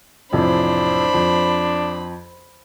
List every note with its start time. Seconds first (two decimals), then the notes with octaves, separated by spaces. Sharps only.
0.33 A1 F2 C3 D4 C5 B5
1.14 F2